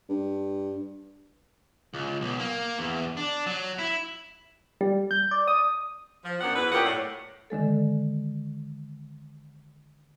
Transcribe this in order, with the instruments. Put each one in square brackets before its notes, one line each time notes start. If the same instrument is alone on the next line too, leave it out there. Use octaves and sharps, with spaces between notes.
[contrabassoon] G2
[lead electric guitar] C#2
B1
A#3
E2
D4
F#3
E4
[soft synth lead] G3
G6
D5
D#6
[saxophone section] F3
F#2 B3 D4 F#5
E2 E4 B4
F#2 A#2 C#3 G4 F#5
A2
[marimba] D3 D#3 G#3 A4